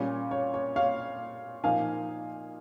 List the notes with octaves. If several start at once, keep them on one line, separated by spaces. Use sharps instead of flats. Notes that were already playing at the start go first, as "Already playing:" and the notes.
Already playing: A#2 G3 C#4
C#5
C#5
C#5 F5
A#2 F3 A#3 D#4 F5 G#5